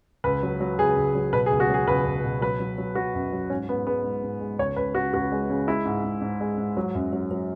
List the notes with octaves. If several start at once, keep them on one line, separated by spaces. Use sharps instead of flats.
C#2 B4
F#3
F#3
C#2 G#4
C#2
F#3
B2 B4
G#4
C#2
F#4
F#3 G#4
C#2 B4
C#2
B2
F#3 B4
F#3
F#3
F#3 F#4
F#2
F#3
G#2 C#4
G#2 B3
G#3 B3
G#2
G#2
G#3
C#2 C#5
C#2 B4
C#3 F#4
C#2 F#4
G#3
C#3
G#3 E4
G#2
G#2
G#2
G#3
G#2
F#3
F#2
F#3
F#3